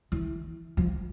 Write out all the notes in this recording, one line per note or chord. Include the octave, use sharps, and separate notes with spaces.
E3
F3